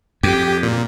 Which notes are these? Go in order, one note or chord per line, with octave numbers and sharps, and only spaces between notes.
F2 G4
A#2